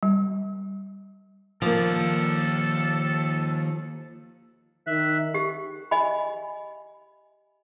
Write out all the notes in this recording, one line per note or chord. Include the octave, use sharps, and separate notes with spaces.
G3
D#2 F3 A#3 A4 D5
D#3 E5 F#6
G4
D#5 G#5 B5